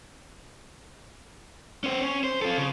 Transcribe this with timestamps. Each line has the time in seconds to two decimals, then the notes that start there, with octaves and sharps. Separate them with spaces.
1.84 C#4 C5
2.02 C#4
2.24 C5
2.42 F4 A4
2.57 C#3